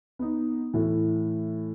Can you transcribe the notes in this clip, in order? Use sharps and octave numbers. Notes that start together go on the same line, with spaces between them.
B3 D#4
A2 E3